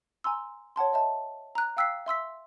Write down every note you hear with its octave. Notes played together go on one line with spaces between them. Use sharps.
G#5 A#5 C6 E6
C#5 F#5 A5 C6
C#5 D#5 E5 A5
A#5 F#6
F5 G5 E6 F#6 B6 C7
E5 C6 E6 B6